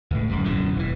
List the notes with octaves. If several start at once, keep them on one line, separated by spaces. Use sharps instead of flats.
C#2 A2
D1 F#2 G3
F#2 B2 D3 E3
E1 E3